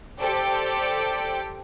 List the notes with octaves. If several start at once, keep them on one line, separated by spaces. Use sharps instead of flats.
G4 A4 C5 D5 G5